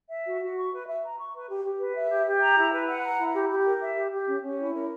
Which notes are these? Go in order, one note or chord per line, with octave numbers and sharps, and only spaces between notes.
E5
F#4
F#4
C#6
B4
E5
A#5
C#6
B4
G4
G4
B4
E5
G4
G4
A#5
E4
B4
F#5
A#5
E4
G4
G4
A#4
E5
G4
G4
C#4
C#4
E4
A#4